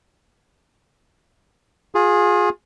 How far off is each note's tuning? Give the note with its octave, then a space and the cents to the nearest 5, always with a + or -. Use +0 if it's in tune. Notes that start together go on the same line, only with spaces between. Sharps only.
F4 +30 G#4 +0